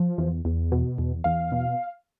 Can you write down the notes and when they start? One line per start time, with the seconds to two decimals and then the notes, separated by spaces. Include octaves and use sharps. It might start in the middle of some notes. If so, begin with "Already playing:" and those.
Already playing: F3
0.18 E2
0.45 E2
0.72 B2
0.98 E2
1.24 E2 F5
1.52 B2